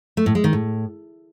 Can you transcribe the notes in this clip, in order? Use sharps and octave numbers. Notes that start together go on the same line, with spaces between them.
A3
A2
G#3
D#3
A2